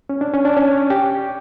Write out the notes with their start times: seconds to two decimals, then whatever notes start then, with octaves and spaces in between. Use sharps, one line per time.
0.09 C#4
0.21 D4
0.34 C#4
0.45 D4
0.57 C#4
0.90 G4